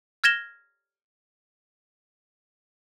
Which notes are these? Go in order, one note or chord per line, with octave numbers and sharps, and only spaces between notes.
F6 G#6 A#6 E7 G7